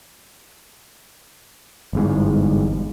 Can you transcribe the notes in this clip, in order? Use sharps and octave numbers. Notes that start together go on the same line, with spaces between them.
G1 E2 G#2